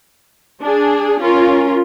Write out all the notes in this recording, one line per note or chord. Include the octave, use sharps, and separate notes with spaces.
D4 G#4
C#4 F4 A#4